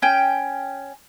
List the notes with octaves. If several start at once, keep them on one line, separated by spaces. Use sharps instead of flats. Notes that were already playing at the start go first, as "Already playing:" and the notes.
C#4 G5